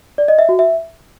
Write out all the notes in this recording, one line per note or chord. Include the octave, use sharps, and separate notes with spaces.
D5
D#5
E5
F#4
E5